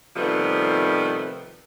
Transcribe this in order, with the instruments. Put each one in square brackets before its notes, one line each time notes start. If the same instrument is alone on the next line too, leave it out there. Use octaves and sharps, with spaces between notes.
[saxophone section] C3 D#3 F3 G3 A3 B3